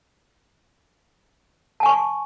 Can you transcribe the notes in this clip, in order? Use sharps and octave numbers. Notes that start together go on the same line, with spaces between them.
G#5 A5 C#6